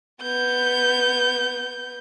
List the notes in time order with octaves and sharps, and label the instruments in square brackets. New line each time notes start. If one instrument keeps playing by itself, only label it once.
[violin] B3 G6